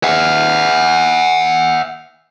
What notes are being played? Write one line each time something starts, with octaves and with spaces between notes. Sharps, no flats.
E5 F#5